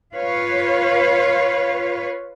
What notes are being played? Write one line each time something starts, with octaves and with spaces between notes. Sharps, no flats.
F4 B4 C#5 F5